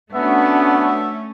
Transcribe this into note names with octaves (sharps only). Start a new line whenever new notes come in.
A3 B3 C#4 D4 F#4 E5